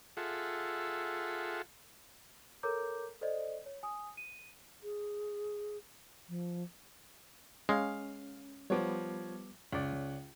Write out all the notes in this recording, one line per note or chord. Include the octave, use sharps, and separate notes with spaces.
F4 G#4 A4 E5 F#5
A4 A#4 C#5 A#5 D6 G6
A4 C5 D5 D#5
C#5
G#5 D#6
D#7
G#4
F3
G#3 C#4 F5
F3 G3 B3 C#5 D6
C#2 C#5 D5